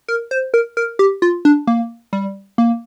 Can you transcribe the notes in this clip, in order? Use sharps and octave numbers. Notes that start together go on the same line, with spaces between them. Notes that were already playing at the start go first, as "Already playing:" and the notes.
A#4
C5
A#4
A#4
G4
F4
D4
A#3
G3
A#3